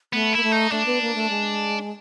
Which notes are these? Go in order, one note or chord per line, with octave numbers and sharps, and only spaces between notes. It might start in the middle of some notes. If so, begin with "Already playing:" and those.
A3 B3
A#3 E4
A3
D#4
A3 D4
B3
A#3
A3
G#3